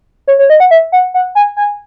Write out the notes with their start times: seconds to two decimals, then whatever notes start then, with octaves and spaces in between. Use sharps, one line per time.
0.28 C#5
0.39 C#5
0.50 D#5
0.60 F#5
0.71 E5
0.92 F#5
1.14 F#5
1.35 G#5
1.57 G#5